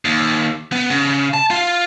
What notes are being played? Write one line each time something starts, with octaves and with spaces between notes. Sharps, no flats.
D#2
B3
C#3
A5
F4